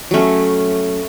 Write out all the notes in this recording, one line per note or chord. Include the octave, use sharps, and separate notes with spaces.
F#3 A3 C#4